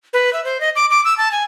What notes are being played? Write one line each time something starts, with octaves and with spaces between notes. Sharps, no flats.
B4
E5
C5
D#5
D6
D6
E6
A5
G#5